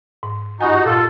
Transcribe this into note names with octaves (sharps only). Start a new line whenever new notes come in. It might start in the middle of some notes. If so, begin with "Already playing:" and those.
G#2
G2 D#4 F4 F#4 G#5
A#2 F4 A4